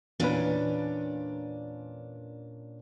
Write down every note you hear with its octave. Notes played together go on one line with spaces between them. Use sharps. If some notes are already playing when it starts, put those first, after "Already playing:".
E2 A#2 C#4 D4 B4